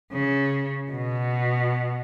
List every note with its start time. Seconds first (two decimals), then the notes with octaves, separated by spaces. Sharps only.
0.12 C#3
0.92 B2